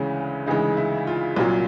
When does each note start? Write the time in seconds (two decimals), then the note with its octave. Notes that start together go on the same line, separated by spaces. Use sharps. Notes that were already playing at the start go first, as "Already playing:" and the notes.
Already playing: D2 C#3 E3 G#3 C#4
0.46 D2 C#3 E3 G#3 D#4
0.77 E4
1.07 F4
1.36 C2 A#2 F#3 F4